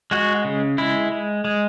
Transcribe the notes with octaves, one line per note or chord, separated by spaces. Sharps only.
G#3 F#4
C#3
G#3 E4
G#3
G#3